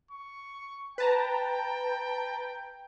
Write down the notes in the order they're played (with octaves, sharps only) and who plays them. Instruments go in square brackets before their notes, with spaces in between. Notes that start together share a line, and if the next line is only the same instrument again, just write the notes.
[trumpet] C#6
[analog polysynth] B4 A5 A#5 [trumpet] G5